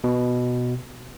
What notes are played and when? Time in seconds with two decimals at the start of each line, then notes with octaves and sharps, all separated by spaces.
0.04 B2